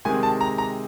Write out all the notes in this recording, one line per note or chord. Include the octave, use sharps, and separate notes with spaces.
C3 D#3 G#3 G#5
A5
A#5
A#5